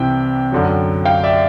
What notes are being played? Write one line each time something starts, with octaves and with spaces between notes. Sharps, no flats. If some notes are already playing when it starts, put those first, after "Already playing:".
Already playing: C2 C3 E3 G5
F#2 D3 F#3
F5 G5
D5 E5